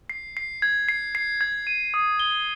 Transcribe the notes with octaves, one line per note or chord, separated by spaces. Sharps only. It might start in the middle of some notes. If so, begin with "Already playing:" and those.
C7
C7
G#6
C7
C7
G#6
D#7
D#6
G7